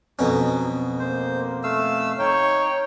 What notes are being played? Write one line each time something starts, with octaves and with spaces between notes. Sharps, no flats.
F2 B2 F#3 C#4
A#3 C5
A3 F5 E6
D#4 C#5 G5